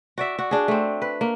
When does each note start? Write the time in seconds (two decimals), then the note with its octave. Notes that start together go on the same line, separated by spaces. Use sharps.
0.18 F#4 D5 E5
0.39 F#4
0.51 D4 G#4
0.68 A3 C4
1.02 B4
1.21 A#3